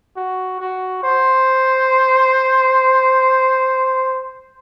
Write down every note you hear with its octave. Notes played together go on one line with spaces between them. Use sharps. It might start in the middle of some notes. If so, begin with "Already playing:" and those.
F#4
F#4
C5